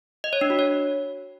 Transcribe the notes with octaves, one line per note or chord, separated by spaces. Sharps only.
D#5
C#5
D4
F#4
C#5